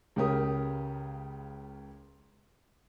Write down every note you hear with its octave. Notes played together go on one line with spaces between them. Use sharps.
C#2 C#3 G4 A#4 D#6